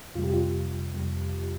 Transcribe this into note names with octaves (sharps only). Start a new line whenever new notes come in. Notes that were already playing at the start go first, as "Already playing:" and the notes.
F2 C3 G3 F4
G4
F4
F2 C3 G3